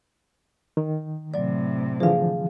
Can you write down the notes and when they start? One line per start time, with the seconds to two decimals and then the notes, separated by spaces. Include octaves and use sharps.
0.77 D#3
1.34 A2 C3 F#3 D5
2.00 D3 E3 F3 G#4 F5